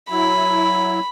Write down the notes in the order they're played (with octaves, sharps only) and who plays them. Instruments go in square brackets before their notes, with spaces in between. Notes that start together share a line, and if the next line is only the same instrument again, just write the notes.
[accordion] F#3 E4 [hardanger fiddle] B5